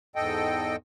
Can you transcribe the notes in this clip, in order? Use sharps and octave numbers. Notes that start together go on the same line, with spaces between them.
E2 G#2 A4 D#5 G5